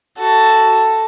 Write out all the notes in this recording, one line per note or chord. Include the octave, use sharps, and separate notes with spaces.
F#4 A4